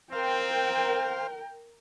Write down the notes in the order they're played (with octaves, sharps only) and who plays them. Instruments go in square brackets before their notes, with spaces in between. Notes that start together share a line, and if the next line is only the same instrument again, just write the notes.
[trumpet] C4 [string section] A#4 [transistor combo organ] C5 F5 [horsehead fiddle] G5